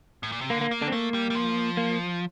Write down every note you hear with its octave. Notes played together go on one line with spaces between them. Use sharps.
A2
A#2
C3
D3 A#3
A#3
A#3
D3 D4
C4
A3 A#3
G3
G3
F3
A#3